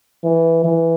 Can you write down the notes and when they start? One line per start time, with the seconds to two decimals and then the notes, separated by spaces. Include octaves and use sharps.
0.24 E3
0.64 E3